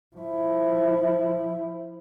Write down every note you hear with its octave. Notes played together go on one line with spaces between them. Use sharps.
F3 E4